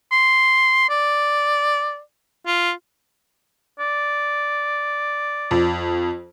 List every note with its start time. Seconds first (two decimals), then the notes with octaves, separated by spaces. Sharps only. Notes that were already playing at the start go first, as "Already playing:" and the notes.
0.12 C6
0.89 D5
2.46 F4
3.79 D5
5.51 F2